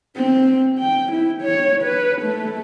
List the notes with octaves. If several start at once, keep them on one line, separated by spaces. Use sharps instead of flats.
C4
G5
E4
C#5
B4
A3